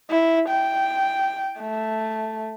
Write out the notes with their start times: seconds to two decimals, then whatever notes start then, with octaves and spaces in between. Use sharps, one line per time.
0.10 E4
0.49 G5
1.59 A3